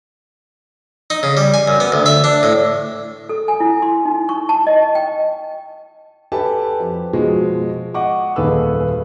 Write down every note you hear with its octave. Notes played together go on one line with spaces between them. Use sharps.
D#4
C#3
G3
G#5
F#2
B3
D2
E5
D4
A2
A4
G#5
E4
C6
D#4
C#6
A5
D#5
G5
G4 A4 B4 G#5 A5
F2
B2 F3 G#3
D#5 F#5 C#6 D6
D#1 D#2 G#4 A4 B4 E6